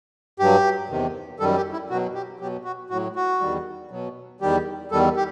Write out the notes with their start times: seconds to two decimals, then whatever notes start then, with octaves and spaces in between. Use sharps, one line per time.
0.39 G2 F#3 G4
0.89 E2 C3 D#3
1.40 F#2 D#3 G3 A4
1.57 G4
1.73 E4
1.90 B2 F#3 F#4
2.15 G4
2.40 B2 F#3 G4
2.64 F#4
2.90 A2 F#4
2.94 F#3
3.16 F#4
3.41 E2 D#3 G3
3.91 B2 F#3
4.41 E2 D#3 G3 G4
4.91 E2 D#3 G3 A4
5.16 G4